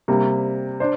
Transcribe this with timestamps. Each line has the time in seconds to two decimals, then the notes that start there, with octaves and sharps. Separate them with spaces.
0.08 C3 G3 A#3
0.80 D4 C5